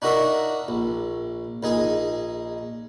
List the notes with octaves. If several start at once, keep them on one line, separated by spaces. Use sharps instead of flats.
D4 D#4 F#4 A#4 E5
A#1
A#1 D#4 G#4